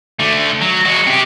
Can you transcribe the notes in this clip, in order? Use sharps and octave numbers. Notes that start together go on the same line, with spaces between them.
D3 A3
F#3
G#3 F#4
C4 G4